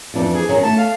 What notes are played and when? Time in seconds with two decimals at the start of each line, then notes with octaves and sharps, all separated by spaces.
0.14 F2 E3 D4
0.33 G#4
0.49 D#3 F#3 C#4
0.63 A3 A5
0.77 F5